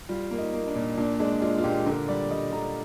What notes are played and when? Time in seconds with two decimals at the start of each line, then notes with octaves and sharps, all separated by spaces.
0.09 G3 F4
0.31 A#3
0.38 D#4
0.53 A#3
0.68 D4
0.75 A#2
0.97 A#2 D4
1.20 G#3 D4
1.42 G#3 F4
1.58 F4
1.64 A#2 G4
1.86 D3 A#4
2.08 G3 D5
2.30 G3 D#5
2.52 D3 A#5